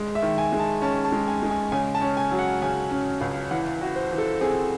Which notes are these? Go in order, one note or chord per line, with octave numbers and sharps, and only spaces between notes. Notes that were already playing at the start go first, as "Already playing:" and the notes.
Already playing: G#3
E5
D#3
G#5
G#3
A5
C#4 A5
A5
G#3
G#5
G#3
G#5
C#3 G#5
A5
C#4
G#5
F#3
F#5
C#3 G#5
C#4
C#2
E3 F#5
F#4
C5
E3
A4
C4 G#4